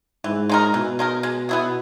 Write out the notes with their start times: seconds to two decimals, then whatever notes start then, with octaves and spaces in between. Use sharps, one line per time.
0.24 G#2 E3
0.50 G#3 D#4 A#4
0.74 B2 E3
0.99 G#3 D#4 A#4
1.23 G#3
1.49 B3 E4 G#4